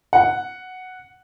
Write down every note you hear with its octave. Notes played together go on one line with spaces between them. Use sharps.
F#5